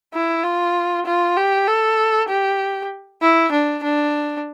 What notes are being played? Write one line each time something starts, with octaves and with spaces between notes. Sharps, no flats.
E4
F4
F4
G4
A4
G4
E4
D4
D4